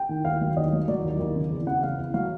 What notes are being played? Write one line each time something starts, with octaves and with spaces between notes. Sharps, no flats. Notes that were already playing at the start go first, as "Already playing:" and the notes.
Already playing: G5
D#3
D#2 F5
F#3
D#2 D#5
F#3
F#3 D5
D#2
D#2
C#3
E2
C#3 F#5
C#3 F5
E2
F#3 F5